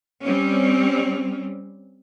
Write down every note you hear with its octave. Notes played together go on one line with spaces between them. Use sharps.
G3 C4 C#4